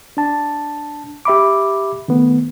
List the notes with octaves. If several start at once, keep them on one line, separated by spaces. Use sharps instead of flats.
D4 A5
G4 E5 B5 D6
D#3 A3 B3